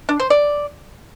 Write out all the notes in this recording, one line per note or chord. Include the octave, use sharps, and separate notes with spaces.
D4
C5
D5